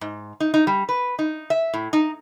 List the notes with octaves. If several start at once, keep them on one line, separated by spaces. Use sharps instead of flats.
G#2
D#4
D#4
G3
B4
D#4
E5
A2
D#4